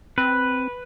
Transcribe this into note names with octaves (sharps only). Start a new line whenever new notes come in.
C4 B4